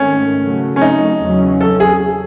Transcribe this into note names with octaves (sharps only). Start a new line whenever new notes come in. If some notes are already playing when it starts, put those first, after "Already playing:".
Already playing: G#2 D#3 A3 C#4
C#3 F#3 A3
C#4
D#4
E2 C#3 F#3 C#4
A4
G#4